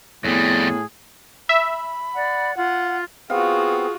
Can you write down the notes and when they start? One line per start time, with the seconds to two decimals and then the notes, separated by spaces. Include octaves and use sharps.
0.24 F2 A2 G3 B3 G#4
1.49 E5 B5
2.14 D5 F#5
2.55 F4 F#5
3.30 B3 C4 F4 F#4 G#4 F5